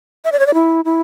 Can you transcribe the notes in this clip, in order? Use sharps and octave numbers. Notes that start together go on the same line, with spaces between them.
E5
D5
C#5
D5
E4
E4